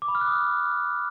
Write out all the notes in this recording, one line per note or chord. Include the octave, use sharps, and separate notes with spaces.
D6
B5
F6
F#6
D#6